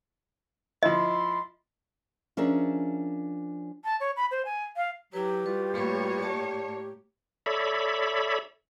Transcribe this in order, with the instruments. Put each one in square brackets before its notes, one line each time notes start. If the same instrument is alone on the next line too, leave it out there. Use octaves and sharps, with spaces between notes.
[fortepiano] F3 E4 [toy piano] D#5 [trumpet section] B5 C6
[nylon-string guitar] F3 C#4 D4 G#4 A#4 E5
[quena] A5
C#5
B5
C5
G#5
F5
[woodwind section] F#3 [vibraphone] E4 B4 [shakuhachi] G4
[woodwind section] G3 F4 F#4 [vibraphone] B4
[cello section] A2 A#3 C#5 [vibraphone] B4 B5
[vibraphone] D5 A5
[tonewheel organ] A4 C#5 D5 E5 B5